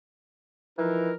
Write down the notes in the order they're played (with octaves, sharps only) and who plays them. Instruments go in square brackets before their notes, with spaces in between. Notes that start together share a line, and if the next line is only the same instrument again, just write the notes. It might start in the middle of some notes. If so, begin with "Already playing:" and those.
[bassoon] E3 [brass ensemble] F3 D#4 A#4